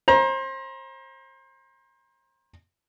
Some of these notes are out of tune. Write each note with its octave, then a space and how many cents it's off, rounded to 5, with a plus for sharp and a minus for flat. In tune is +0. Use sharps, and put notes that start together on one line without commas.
C5 +30 A#5 +30